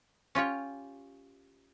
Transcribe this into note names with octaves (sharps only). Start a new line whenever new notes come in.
C#4 F4 G4 C#5